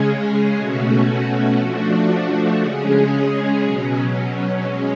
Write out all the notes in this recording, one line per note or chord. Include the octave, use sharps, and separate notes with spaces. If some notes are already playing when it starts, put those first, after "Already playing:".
Already playing: C#3 G#3 C#4 G#4
B2 A3 C#4 F#4
F3 A3 D4 F#4
C#3 G#3 C#4 G#4
B2 F#3 C#4
G#3 C#4